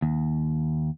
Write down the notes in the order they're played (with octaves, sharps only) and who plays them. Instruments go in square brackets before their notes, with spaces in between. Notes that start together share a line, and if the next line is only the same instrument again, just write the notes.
[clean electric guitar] D#2